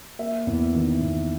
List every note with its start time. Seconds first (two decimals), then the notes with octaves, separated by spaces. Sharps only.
0.19 A#3 E5
0.47 E2
0.75 D#3
1.01 E2